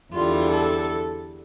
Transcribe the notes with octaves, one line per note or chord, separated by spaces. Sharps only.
E2 D3 G3 F4
A4